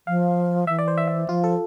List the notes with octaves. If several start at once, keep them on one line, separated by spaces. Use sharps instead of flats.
F3 F5
E3 E5
D5
C5
E5
E5
F3 F4
A4